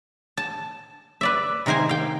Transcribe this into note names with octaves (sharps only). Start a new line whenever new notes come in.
A5
B4 D5 E5
C3 D#3 A#4 C5 G#5
F5 G5